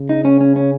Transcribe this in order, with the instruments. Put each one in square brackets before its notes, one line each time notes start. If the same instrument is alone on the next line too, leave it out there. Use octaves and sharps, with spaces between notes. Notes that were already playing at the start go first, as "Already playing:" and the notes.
Already playing: [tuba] C#3
[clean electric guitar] D#4
C#4
C#4
C#4